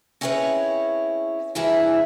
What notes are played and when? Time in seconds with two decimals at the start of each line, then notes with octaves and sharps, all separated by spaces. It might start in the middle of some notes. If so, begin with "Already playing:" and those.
0.21 C4 C#4 E4 G#4 B4 C#5
1.55 G2 C3 E3 E4 G#4 E5